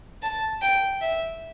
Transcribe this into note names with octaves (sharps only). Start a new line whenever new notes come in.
A5
G5
E5